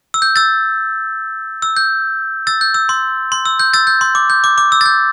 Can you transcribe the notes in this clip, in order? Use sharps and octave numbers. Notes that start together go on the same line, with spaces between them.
E6
G6
E6 A6
E6
G6
E6 A6
G6
E6
C6
C6
E6
G6
E6 A6
G6
C6
D6
G6
D6
D6
E6
A6
G6